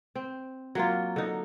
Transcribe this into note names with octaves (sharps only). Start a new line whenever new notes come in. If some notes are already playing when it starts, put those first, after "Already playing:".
C4
F#3 A#3 F4
D3 D#4